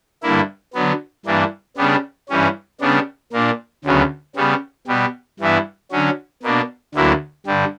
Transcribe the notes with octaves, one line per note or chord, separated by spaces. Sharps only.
G2 D3 A#3 E4
D3 F#3 B3
G2 E3 A#3 D4
C#3 G3 B3 D4
G2 E3 G3 C#4
C#3 G3 B3 D4
A#2 A#3 D4
D2 C#3 F#3 B3
C#3 G3 B3
B2 G3 B3
G2 E3 B3 E4
D3 F#3 C#4
B2 A#3 D4
D2 D3 F#3 A#3 E4
G2 D3 G3